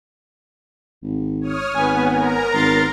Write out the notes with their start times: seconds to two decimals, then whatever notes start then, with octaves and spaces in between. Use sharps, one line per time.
1.02 G#1
1.41 C#5 D#6 F6
1.75 G#1 B3 B4 G#5
2.11 A#4 G#5 A#5
2.54 G#1 C6 A6